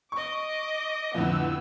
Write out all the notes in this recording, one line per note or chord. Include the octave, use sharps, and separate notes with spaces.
D#5 C#6 D6
F2 A2 D3 B3 E6